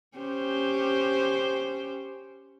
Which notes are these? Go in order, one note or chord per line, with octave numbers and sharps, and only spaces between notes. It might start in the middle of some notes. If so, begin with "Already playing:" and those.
C#4 G4 C5